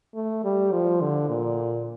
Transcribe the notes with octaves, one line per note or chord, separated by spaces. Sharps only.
A3
G3
F3
D3
A#2